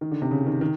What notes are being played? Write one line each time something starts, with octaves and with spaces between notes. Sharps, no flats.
D#3
D3
C3
C#3
D#3
D#3